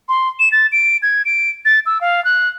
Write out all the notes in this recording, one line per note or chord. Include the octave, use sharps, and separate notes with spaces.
C6
E7
A6
D7
G#6
D7
A6
E6
F5
F#6